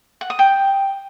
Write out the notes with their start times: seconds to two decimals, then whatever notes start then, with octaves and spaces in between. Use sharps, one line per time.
0.21 F#5
0.30 D#6
0.39 G5